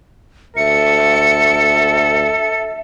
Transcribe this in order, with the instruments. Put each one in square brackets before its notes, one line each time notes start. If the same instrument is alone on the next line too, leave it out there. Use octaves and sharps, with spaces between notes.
[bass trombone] D2 [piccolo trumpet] A4 [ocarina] E5 [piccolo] C#7